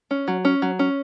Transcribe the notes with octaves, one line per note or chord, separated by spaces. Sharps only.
C#4
F#3
C#4
F#3
C#4